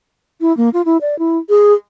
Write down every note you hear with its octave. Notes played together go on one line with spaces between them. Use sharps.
E4
A#3
F4
E4
D5
E4
G#4